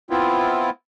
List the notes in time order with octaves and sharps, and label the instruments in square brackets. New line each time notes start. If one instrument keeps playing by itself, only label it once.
[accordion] B3 C4 E4 F4